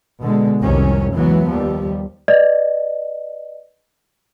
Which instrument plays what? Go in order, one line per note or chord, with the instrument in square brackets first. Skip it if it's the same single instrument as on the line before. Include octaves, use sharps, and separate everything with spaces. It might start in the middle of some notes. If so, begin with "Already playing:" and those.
[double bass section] B2 D3 G#3
F1 C2 C3 D#3 C#4
C#2 E3 F#3 B3
D#2 F3 G3
[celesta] B4 D5 D#5